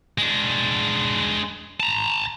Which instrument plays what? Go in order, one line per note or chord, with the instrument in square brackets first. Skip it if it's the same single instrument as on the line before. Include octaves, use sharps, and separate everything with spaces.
[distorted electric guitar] G#3 D4
A5 A#5